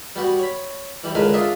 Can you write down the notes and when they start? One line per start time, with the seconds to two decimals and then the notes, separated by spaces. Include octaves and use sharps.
0.16 G3 B3 F#4
0.39 C#5 B5
1.04 E3 G3
1.15 C#2 D3 D#3 G#3 A#4 B4
1.33 D4 F4 G#4 D#5 E5